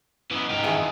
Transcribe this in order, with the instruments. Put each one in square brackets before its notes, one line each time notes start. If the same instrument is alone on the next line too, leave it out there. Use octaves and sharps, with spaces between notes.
[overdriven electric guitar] F#2 E3 [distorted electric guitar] B3 [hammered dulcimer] D#4 F#5
[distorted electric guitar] C#2 G#2 [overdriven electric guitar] G4 A#4
[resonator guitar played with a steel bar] D#3 E3 G#4 [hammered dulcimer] A5
[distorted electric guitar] F4 D#5